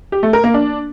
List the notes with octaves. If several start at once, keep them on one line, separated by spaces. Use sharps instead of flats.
G4
A3
A#4
A#3
D4